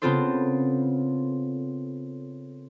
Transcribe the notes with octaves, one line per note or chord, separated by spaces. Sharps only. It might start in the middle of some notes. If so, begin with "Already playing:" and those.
C#3 B3 C4 F4 A4 C5